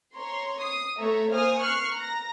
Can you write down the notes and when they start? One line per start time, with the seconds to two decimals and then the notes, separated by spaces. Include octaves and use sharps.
0.17 C#5 A#5 C6
0.62 D#6 C7
0.99 A3 A4 C#5 E5 A#5
1.32 A#3 C5 F5 G#5 D#6 F6
1.60 C#6 F6 F#6 C7 C#7
1.95 A#5 A#6